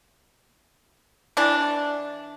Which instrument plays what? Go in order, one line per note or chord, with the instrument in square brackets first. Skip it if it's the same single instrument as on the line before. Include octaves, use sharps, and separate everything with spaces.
[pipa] E3 D4